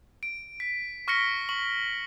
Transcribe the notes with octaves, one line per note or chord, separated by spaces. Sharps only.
D7
B6
C#6 F6 A#6 B6 C#7 G7
C#6 F#7